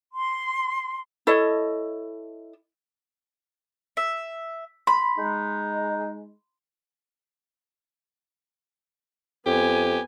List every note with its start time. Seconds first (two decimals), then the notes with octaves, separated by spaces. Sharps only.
0.14 C6
1.27 E4 A4 C#5 D#5
3.97 E5
4.87 B5 C6
5.18 G#3 D#4
9.46 F2 B3 G4 G#5